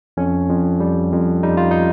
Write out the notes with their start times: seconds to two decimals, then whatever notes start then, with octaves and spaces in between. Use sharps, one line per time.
0.17 F2 C#4
0.49 F2
0.80 G3
1.12 F2
1.43 G3 D#4
1.57 F4
1.71 D#4